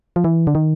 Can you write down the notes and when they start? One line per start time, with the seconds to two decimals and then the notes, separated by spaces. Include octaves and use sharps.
0.16 F3
0.24 E3
0.47 D3
0.55 D#3